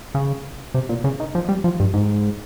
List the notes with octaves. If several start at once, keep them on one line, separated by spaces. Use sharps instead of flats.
C#3
C3
A#2
C#3
D#3
F3
G3
F3
G2
G#2